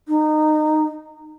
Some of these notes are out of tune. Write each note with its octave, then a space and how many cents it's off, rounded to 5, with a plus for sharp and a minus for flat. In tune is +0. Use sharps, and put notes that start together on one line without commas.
D#4 -20